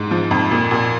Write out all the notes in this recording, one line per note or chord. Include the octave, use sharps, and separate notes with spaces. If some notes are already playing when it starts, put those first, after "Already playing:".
Already playing: G#2
F3
F2
A#2
A#2